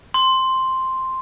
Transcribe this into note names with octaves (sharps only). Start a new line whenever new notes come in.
C6